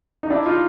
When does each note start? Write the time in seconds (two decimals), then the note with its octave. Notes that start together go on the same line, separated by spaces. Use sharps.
0.23 D#4
0.30 D4 E4
0.46 D#4 F4